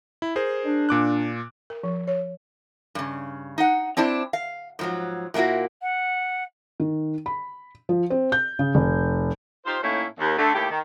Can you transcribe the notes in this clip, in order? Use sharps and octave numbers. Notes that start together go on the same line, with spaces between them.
E4
G#4 A#4 C5
D4
A#2 D6 F#6
A#4
F3
C#5
G2 C#3
D#4 F#5
C4 D4 E4 C5 D5
F5
G#2 F3 F#3
A#2 G#3 A#3 E4 F#4
F#5
D#3
B5
F3
C4
G6
C#3
F1
D#4 F4 G4 C5
A2 A3 A#3 C#4 D#4 E4
D#2
D3 A3
D#2 A3 E4 G4
D#3